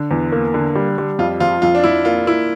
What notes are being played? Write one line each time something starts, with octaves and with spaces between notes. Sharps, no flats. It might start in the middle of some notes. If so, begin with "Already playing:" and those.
Already playing: D3
E2
A#3
D3
G3
G3
F2 F4
F3 F4
F2 F4
D4
F2 E4
A#3 F4
A#3 E4